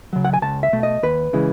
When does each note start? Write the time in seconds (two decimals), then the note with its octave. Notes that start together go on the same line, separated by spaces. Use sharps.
0.13 C#3 F#3
0.25 F#5
0.34 G#5
0.42 C#2 A5
0.63 E5
0.73 B2 A3
0.83 D#5
1.03 D#2 B4
1.33 C#3 E3 G#3